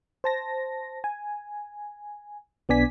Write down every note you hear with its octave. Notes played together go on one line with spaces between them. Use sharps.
C5 A5 A#6
G#5
B1 B3 D4 D5 G#5 B6